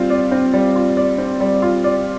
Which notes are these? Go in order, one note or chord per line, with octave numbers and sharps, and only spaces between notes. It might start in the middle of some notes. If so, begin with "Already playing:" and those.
Already playing: G3 C4 F4
D5
C4
G3
F4
D5
C4
G3
F4
D5